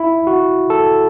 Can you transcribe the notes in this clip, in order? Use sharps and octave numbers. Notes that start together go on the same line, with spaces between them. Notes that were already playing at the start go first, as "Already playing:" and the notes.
Already playing: E4
F#4
A4